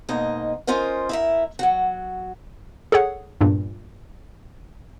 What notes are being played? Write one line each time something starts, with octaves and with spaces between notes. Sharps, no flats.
G#2 B2 A#3 D#4 D#5
C#4 F4 A#4 C5 D#5
E4 A#4 E5
F#3 F#4
G#4 A4 C#5 F#5
E2 G2 A#2